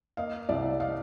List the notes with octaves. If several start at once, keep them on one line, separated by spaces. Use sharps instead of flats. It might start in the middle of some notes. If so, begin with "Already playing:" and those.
A#3 D#5 F5
C2 D5 E5
D#5 F5